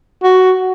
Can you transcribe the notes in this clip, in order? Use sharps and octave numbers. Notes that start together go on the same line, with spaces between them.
F#4